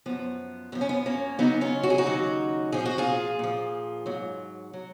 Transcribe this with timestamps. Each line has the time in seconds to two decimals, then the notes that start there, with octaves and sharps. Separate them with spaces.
0.06 F#2 F3 B3
0.72 F#2 F3 B3
0.81 C#4
0.89 B3
1.06 A#3 C#4
1.39 D#2 C#3 F#3 B3 D#4
1.61 C#4 F4
1.83 F#4
1.90 G#4
1.98 D#4 F#4
2.06 D#2 C#3 F#3
2.72 A#2 F3 G#4
2.86 F#4
2.98 F4 G#4
3.39 A#2 F3
4.06 G#2 F#3
4.73 F#3